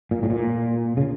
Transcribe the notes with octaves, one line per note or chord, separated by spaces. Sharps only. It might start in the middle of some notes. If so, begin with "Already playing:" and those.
A#2
A2
A#2
C#3